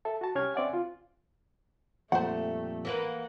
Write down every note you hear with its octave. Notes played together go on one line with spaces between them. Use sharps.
A4 E5 A5
F#4 A5
C2 C#4 G4 F6 G#6
C4 C#4 D5 E5 F#5 G#5
C#2 F4
F2 A#2 G3 A3 C5 F#5
E3 A#3 B4 F#5